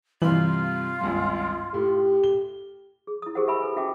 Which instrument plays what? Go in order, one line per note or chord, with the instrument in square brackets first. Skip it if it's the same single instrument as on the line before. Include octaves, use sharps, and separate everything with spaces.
[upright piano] G2 C3 F#7 [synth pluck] E3 [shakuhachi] F4
[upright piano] G#1 C#2 G2
[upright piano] A2 [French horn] G4
[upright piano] G7
[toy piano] G#4
E4 D#6
G4 G#4 A#4 C5 F#5
G4 A#4 E5 G#5 B5 E6
G#4 A4 B4 G#5
C#4 F#4 E5 G5 A5 D6